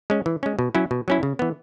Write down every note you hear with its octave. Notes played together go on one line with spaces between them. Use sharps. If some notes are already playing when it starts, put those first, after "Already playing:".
G#3 C#4
E3
G#3 C#4
B2
F#3 C#4 E4
B2
F#3 C#4 E4
C#3
E3 B3